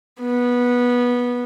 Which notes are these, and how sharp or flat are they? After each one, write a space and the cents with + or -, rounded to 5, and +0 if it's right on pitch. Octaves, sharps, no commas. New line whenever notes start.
B3 -15